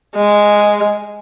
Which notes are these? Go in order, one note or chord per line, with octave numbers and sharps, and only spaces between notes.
G#3